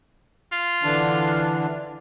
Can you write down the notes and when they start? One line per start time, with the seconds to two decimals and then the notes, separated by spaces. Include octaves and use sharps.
0.52 F4
0.84 D3 E3 D4